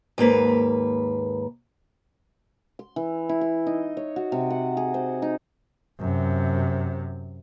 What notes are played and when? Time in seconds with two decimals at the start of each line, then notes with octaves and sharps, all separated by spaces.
0.18 D#2 G#2 A#3 B4
2.79 C6
2.96 E3
3.29 E4
3.41 C6
3.67 D#4
3.97 C#5
4.16 F#4
4.32 C3
4.50 F#5
4.77 G#4
4.94 C5
5.22 D#4
6.00 F#2 C3